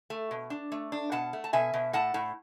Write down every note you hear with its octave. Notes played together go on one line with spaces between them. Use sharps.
A3
B2
D4
A3
D4
B2 F#5 A5
A3
A5
B2 E5 G#5
B2
A2 F#5 A5
A2